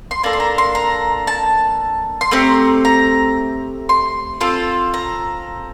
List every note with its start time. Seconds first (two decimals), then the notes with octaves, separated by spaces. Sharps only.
0.11 C6
0.23 A#3 D4 A4 A#5
0.33 C6
0.40 A#5
0.58 C6
0.75 A#5
1.27 A5
2.21 C6
2.31 A3 C4 G4 A#5
2.85 A#5
3.89 C6
4.41 C4 F4 A4
4.94 A#5